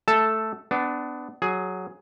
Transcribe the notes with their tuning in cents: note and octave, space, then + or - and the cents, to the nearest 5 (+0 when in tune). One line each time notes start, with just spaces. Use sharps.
A3 +0 A4 +0 A5 +0
B3 +25 D4 +0
F#3 +0 G#4 +10